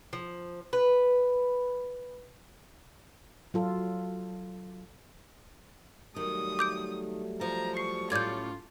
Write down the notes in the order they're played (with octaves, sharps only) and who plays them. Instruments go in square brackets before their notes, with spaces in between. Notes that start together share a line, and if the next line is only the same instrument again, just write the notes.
[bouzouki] F3
B4
[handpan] F#3 F4 A4
[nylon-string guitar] D#3 [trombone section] F#3 G3 A3 [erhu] D#6
[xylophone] D6 G6 D7
[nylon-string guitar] F3 [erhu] A#5
[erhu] C#6 [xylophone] C7
[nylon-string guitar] A2 C#4 D5 [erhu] F4 [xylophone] G6 G#6